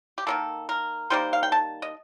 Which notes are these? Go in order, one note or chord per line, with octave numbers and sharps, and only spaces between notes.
G4
D#3 G3 A#3 A4
A#4
D#3 G3 A#3 C5
F5
G5
A5
D#5